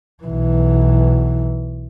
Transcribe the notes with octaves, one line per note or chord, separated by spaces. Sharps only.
B1 E3